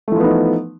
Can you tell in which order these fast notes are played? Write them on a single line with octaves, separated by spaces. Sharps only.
A3 E3 F3 B3 D#4